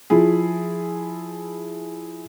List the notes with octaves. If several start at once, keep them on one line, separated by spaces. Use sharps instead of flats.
F3 E4 G#4